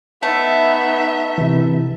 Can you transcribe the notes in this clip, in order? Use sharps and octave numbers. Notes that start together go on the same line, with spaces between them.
A3 B3 D#4 E5
C3 E3